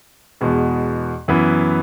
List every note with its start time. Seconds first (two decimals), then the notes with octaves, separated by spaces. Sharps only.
0.41 E2 B2 G#3
1.28 F#2 E3 B3